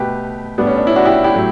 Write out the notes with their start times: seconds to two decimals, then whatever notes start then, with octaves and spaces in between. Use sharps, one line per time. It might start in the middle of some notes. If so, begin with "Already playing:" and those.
Already playing: B2 A3 G4 B4
0.58 A2 G3 B3 D4
0.67 C#4
0.77 D4
0.86 C#4 E4
0.96 D4 F#4
1.05 E4 G4
1.24 E4 G4
1.34 A2 F#3